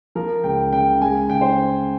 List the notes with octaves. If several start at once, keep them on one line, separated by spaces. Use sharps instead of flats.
F3 A#4
C#2 G5
C#3 G5
G#3 G#5
C#3 G5
C5